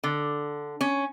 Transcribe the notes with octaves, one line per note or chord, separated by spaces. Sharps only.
D3
C#4